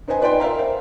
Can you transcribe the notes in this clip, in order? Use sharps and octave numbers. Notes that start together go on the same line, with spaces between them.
D#4 B4 C5 D#5 G#5
F4 B4 D5 D#5 G5 C6
A#4 E5 F5 A#5
C5